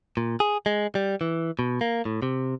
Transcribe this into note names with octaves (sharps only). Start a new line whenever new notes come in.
A#2
G#4
G#3
G3
E3
B2
A#3
A2
C3